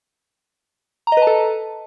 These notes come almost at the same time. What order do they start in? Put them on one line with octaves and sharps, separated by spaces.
A#5 D#5 B4 A5 A4